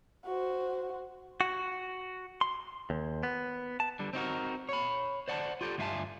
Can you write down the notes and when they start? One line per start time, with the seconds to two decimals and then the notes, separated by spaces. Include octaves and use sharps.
0.25 F#4 C5
1.41 F#4
2.41 C6
2.90 D#2
3.23 B3
3.80 A5
3.99 D3 G3
4.13 C4 D#4 F#4 A#4
4.69 C#5 B5
5.28 C5 D5 F#5 G#5 A5
5.61 F4 G4 A4
5.78 D2 G2 F4 E5 G#5 A5